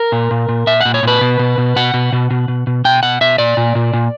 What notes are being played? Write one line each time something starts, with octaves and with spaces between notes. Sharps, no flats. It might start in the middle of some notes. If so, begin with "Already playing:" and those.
Already playing: A#4
A#2
A#2
A#2
A#2 E5
A#2 F#5
C#5
A#2 B4
B2
B2
B2
B2 F#5
B2
B2
B2
B2
B2
B2 G5
B2 F#5
B2 E5
A#2 D5
A#2
A#2
A#2